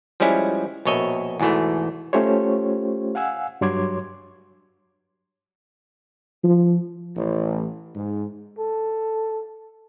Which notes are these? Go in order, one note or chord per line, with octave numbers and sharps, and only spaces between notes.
F3 G3 G#3 C#4 E4
A#1 B2 C#5 D#5 E5
E2 G#2 B2 E3 A3
A3 C#4 F4 G4 C5 C#5
F5 F#5 G#5 E6
G2 F#3 C#5 C6 D6 G#6
F3
A1
G#2
A4